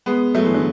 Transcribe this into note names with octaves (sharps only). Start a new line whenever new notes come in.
G#3 B3
F#3 A3
E3 G#3
D3 F#3